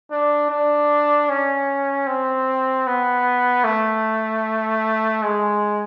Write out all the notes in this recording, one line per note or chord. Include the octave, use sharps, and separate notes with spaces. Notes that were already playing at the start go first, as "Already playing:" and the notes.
D4
D4
C#4
C4
B3
A3
G#3